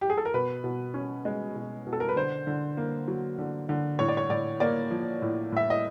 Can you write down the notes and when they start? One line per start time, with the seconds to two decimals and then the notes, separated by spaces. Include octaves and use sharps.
0.01 G4
0.10 G#4
0.17 A4
0.25 A#4
0.34 B2 B4
0.64 B2
0.94 C#4
1.25 G#3
1.55 B2
1.87 B2
1.93 A4
2.00 A#4
2.09 B4
2.16 D3 C5
2.47 D3
2.77 A#3
3.08 F#3
3.38 D3
3.69 D3
3.99 A2 C#5
4.08 D5
4.17 C#5
4.30 A2 D5
4.60 A#3 D5
4.91 F3
5.22 A2
5.52 A2 E5
5.70 D#5